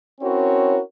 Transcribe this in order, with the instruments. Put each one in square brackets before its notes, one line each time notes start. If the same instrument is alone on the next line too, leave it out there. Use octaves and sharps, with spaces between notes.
[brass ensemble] C4 C#4 E4 F#4 A#4 C#5